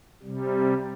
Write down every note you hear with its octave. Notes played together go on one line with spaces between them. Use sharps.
C3 G3